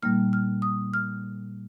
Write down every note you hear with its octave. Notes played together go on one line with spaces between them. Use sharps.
A#2 G3 A#3 D#4 F6
F6
D#6
F6